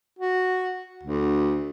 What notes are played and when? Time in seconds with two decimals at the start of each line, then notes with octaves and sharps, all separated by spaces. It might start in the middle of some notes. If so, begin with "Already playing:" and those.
0.19 F#4
1.03 D2